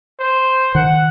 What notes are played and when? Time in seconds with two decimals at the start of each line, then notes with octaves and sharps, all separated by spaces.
0.20 C5
0.75 D#3 F#5